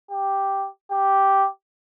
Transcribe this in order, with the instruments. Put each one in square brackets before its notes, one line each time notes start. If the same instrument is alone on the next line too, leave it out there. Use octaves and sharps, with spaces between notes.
[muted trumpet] G4
G4